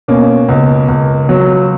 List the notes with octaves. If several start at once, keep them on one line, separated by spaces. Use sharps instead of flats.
B2 A#3 C#4
C#2
C#2
F#3